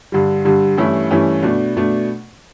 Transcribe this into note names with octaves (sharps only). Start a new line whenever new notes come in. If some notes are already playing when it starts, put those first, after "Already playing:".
G2 D3 G3
G2 D3 G3
G2 E3 A3 C#4 E4
G2 E3 A3 C#4 E4
B2 A3 D4
B2 A3 D4